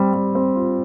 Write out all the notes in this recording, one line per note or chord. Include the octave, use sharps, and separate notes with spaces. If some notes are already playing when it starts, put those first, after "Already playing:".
Already playing: G3 C4
G3
C4
F4